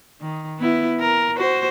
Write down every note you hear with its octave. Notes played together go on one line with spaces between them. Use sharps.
D#3
B3 E4
A#4
F#4 C5